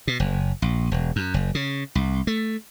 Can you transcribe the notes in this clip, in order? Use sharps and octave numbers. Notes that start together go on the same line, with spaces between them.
B2
F#1
A#1
E1
F#2
F#1
C#3
C2
A3